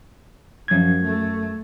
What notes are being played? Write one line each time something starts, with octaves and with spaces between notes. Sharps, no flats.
F#2 F3 G#6
A3